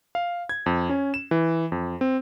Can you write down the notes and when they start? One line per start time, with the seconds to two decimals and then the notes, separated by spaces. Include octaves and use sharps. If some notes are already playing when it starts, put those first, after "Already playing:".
0.15 F5
0.49 G#6
0.66 F2
0.89 C#4
1.14 E7
1.31 E3
1.72 F2
2.01 C4